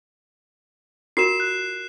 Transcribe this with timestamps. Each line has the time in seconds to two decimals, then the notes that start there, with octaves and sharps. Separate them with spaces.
1.17 F4 F#4 A#4 C7 E7
1.40 F#6